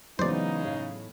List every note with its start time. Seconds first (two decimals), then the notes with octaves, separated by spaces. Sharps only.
0.19 C#3 E3 F#3 G#3 B3 D#4 C5 D5
0.65 A2 C#5 F5